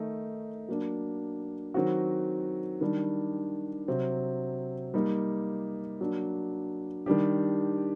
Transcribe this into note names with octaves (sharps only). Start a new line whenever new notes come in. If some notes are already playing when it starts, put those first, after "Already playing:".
Already playing: D#3 A3 D#4
F#3 A#3 D4
D#3 F#3 C4 F#4
D#3 G3 D4
C3 F#3 C4
G3 A#3 D#4
F#3 A#3 D4
D#3 G3 D4 G4